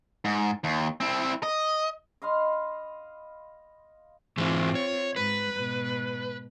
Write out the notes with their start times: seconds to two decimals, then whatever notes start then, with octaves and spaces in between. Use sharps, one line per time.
0.25 G#2
0.64 D#2
1.00 C4 E4
1.43 D#5
2.22 D#5 F5 B5 C6
4.37 G#2 E3 G#3 C4 F4
4.75 C#5
5.16 G#2 B4
5.54 G#2 B2